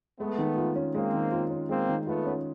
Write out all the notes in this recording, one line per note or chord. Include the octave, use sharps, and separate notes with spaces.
G#3 A3 B3
D#3
F4
C#4
G#3 A#3 C4
D#3
F4
C#4
G#3 A#3 C4
D#3
A3 B3 F4
C#4